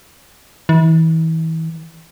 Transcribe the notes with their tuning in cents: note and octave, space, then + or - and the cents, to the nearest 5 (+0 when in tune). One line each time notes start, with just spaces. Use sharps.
E3 -35